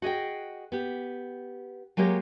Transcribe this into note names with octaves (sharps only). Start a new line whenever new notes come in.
F#4 G#4 D#5 G5
B3 G4
F#3 G#3 A#3 G4 C#5